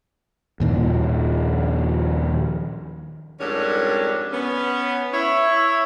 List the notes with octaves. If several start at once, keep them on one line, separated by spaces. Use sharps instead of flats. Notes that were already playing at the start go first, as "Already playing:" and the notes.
D#2 A#2 D#3 F3
F2 G#2 G3 C#4 D4 A#4
B3 C#4
E4 C#5 E5